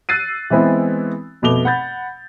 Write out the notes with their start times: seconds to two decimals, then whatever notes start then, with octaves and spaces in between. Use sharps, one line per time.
0.09 E6 F#6 A6 C7 D#7
0.50 E3 G#3 B3 C4 E4
1.42 F1 B2 A3 D6 F7 G7
1.65 F#5 B5 G6 A6